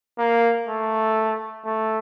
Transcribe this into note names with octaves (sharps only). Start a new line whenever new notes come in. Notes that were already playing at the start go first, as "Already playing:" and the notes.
A#3
A3
A3